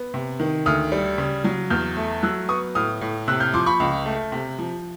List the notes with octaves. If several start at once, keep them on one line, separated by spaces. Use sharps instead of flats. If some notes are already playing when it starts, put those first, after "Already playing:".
Already playing: B3
C3
D#3
D2 D#6 F6
G3
C#3
F#3
E2 F6 G6
A3
F#3 E6 F#6
B3 C#6 D#6
A2 D#6 F6
A2
C3 E6 F#6
F6 G6
F3 C6 D6
B5 C#6
C#2
A3
C3
F3